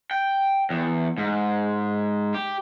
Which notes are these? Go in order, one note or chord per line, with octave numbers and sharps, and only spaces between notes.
G5
E2
G#2
G4